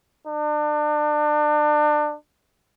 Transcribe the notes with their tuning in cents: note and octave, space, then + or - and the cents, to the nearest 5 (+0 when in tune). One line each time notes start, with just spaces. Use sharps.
D4 +30